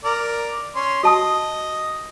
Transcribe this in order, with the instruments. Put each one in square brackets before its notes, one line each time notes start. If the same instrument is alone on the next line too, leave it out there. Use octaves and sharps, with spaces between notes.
[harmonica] A#4 D5
C#4 C6
[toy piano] F#4 A5 D#6 [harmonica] D#5